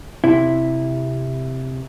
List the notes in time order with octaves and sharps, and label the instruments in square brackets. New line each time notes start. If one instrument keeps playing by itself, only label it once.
[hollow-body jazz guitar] C3 E4